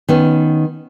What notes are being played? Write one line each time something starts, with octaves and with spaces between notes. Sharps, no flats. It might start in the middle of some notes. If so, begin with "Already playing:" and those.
D#3 B3 C#4